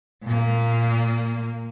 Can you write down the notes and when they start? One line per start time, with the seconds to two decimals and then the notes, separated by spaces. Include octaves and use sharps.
0.24 A#2 A#3